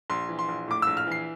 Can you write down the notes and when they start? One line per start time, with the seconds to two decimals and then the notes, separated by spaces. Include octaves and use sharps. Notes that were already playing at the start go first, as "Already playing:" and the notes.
0.10 A#1 C6
0.29 E3
0.39 C6
0.48 A#1
0.68 A2 D6
0.82 A#1 E6
0.97 F6
1.07 E3 C7